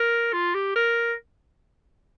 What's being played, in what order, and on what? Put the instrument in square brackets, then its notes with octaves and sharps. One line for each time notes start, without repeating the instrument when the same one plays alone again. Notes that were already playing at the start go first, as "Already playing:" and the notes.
Already playing: [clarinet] A#4
F4
G4
A#4